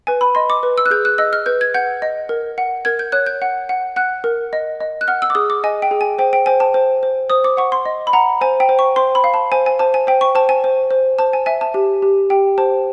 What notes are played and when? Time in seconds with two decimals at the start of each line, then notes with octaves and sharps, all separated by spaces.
0.07 B4 G#5
0.21 B5
0.35 D#5 C6
0.50 D6
0.63 B4
0.78 E6
0.86 F#6
0.91 G#4 G6
1.05 F#6
1.18 D#5 E6
1.33 F6
1.46 B4 G6
1.61 G#6
1.74 F#5 G6
2.02 D#5
2.29 A#4
2.58 F#5
2.85 A#4 G#6
2.99 G6
3.12 C#5 F#6
3.26 G6
3.42 F#5
3.69 F#5
3.96 F#5 F#6
4.24 A#4
4.53 D#5
4.81 D#5
5.01 F#6
5.08 F#5 F6
5.22 E6
5.30 D6
5.35 G#4 D#6
5.50 D6
5.64 D#5 G#5
5.82 G5
5.91 G#4
6.01 G#5
6.18 C5 G5
6.33 G5
6.46 C5 G#5
6.60 A5
6.74 C5
7.03 C5
7.30 C5 D#6
7.44 D6
7.57 F#5 C#6
7.72 C6
7.86 D#5
8.07 B5
8.13 F#5 A#5
8.41 C5 G#5
8.60 G5
8.69 C5
8.79 C#6
8.96 C5 C6
9.15 B5
9.24 F5
9.34 A5
9.52 C5 G#5
9.66 G#5
9.79 C5 A5
9.94 G#5
10.07 C5 G5
10.21 C#6
10.35 C5 A5
10.49 G#5
10.64 C5
10.91 C5
11.19 C5 A5
11.33 G#5
11.46 E5 G#5
11.61 A5
11.74 G4
12.02 G4
12.30 G4 G5
12.58 C5 A5